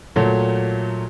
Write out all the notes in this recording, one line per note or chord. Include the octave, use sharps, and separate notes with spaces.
A#2 F#3 A3